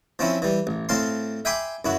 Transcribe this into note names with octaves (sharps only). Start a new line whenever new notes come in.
F3 C4 C#4 E4
E3 G3
A1
A2 C4 F5 A5 C6
E5 G5 G#5 B5 C6 D6
F#2 E4 F#4